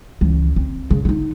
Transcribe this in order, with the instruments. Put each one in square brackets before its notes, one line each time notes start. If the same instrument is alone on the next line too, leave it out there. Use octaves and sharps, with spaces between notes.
[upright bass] C#2 E3
C4
C#3
D3 D#4